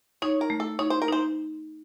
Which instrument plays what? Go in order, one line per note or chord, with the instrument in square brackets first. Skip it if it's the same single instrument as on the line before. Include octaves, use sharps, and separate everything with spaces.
[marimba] D#4 [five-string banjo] C#5
[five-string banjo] A#4
[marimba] A3
[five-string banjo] A4
[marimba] D#4 [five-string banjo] C#5
[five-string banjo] C5
A#4
[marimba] D#4 [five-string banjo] C5